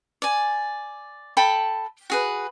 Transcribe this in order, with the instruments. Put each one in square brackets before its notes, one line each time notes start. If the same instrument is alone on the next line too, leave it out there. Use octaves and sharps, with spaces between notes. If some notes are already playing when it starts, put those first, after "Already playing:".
[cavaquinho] D5 G#5
A4 G5 A5 B5
F#4 G#4 B4